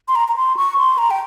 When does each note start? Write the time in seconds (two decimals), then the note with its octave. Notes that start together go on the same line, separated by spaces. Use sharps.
0.08 C6
0.15 A#5
0.28 A#5
0.36 C6
0.57 C#6
0.78 C6
0.98 A#5
1.11 G5